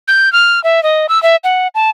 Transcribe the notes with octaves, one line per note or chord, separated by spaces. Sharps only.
G6
F6
E5
D#5
E6
E5
F#5
A5